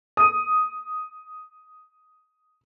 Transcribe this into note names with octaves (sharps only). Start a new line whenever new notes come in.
D#6 D#7